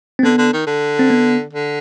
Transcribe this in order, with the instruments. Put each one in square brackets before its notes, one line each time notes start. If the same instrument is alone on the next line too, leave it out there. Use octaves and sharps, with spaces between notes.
[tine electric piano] C4
[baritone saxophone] D3 [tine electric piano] B3
[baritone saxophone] D3
D#3
D3
[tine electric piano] C4
B3
[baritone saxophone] D3